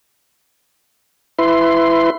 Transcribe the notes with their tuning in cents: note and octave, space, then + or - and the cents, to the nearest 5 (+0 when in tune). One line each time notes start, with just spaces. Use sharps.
E4 +10 B4 +25 C6 +0